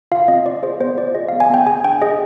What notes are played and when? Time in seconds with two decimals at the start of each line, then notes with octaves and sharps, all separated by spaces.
0.12 F4 F5
0.28 C4 D#5
0.46 F4 D5
0.63 G#4 C5
0.80 B3 C5
0.97 F4 D5
1.15 G#4 D#5
1.28 F5
1.33 B3
1.40 G#5
1.50 B3 G5
1.66 G#4 G#5
1.84 D4 G5
2.02 G#4 D#5